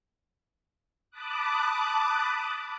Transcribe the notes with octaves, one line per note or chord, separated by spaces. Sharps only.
A5 B5 D6 D#6 F#6